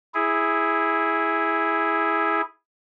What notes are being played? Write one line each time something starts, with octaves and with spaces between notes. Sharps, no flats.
E4 G#4